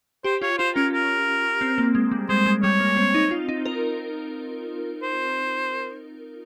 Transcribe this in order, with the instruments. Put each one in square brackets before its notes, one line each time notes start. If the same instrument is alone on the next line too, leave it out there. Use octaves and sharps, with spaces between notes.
[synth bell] G4 [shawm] C5
[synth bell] F4 [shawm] C#5
[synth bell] F4 [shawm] C5
[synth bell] C#4 [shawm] A#4
[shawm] A#4
[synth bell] C4
A#3
G#3
G3
[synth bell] G#3 [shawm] C5
[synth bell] G#3
[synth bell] G3 [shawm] C#5
[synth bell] A#3
C4
D#4
F4
D#4
A#4
[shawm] C5